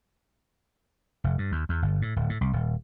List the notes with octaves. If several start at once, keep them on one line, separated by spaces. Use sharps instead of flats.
F1
G2
D#2
E2
G1
A2
D1
A2
C2
D#1